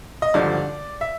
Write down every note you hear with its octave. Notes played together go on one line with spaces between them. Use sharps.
D#5
G#1 G2 D3 F3 D5
E5